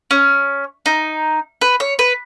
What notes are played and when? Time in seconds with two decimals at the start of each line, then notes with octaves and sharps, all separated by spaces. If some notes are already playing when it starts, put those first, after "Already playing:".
0.11 C#4
0.86 D#4
1.61 B4
1.80 C#5
1.99 B4